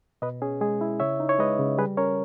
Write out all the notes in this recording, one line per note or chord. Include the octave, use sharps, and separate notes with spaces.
B2 B4 D#5
C#4 G#4
G#3 G#4
E4
C#3 C#5 E5
D#4
C#5
G#3 B4 D#5
C#3
G3 G#4 B4
C#4 A#4 C#5